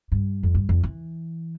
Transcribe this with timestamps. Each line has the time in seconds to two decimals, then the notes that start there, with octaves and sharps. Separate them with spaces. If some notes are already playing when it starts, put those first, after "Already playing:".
0.12 G2
0.43 F2
0.55 G2
0.69 F2
0.83 E3